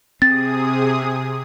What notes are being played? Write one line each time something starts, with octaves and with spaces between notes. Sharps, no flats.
C3 C4 G#4 D#6 A6